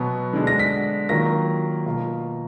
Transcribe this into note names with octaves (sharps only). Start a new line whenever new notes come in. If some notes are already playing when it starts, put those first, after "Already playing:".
Already playing: B2 F#3 B3
D3 G#3 D4
A#6
B6
D#3 F#3 A#3 F4 A#6
B2 A#3 F4